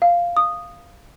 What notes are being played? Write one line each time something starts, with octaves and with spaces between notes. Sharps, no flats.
F5
D#6